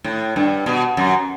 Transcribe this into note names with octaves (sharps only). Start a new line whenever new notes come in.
A2
G2
B2
F#2